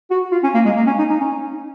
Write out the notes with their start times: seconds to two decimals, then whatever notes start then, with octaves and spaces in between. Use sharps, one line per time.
0.11 F#4
0.32 F4
0.43 C#4
0.54 A#3
0.66 G#3
0.77 A#3
0.87 C#4
0.99 D#4
1.10 D#4
1.21 C#4